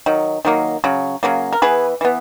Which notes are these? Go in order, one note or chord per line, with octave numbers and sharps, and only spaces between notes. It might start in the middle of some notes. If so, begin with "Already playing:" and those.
D#3 F#3
D#3 F#3 A#3
C#3 F#3
C#3 F#3 A#3
A#4
E3 B3 G#4 B4
E3 B3